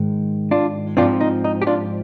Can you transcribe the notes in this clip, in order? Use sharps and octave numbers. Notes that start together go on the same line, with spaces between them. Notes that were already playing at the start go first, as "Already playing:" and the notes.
Already playing: G#2 D#3 G#3
D4 F4
G#2 F3 C4 D4 F4
D#4
D#4
G4
D4 F4